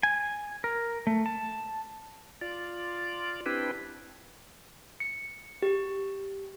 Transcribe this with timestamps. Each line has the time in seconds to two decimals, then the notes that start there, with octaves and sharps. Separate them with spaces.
0.03 G#5
0.64 A#4
1.07 A3
1.26 A5
2.41 F4 D5
3.46 C4 D4 E4 G4 B4
5.00 C#7
5.62 G4